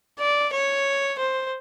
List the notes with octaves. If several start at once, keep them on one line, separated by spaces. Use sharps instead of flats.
D5
C#5
C5